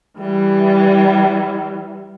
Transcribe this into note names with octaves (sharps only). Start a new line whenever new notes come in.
E3 G3